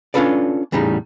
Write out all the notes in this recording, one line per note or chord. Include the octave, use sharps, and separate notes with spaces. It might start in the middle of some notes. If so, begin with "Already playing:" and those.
C#4 D4 F4 A4 B4 D5
E2 A2 C#3 G3 D#4